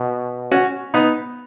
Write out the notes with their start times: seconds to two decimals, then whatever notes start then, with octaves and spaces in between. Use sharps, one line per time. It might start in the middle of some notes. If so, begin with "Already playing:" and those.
Already playing: B2
0.51 C#4 F#4
0.94 B3 D#4